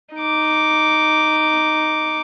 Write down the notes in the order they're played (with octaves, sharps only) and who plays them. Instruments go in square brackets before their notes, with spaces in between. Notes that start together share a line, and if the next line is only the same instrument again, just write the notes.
[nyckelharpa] D#4 D6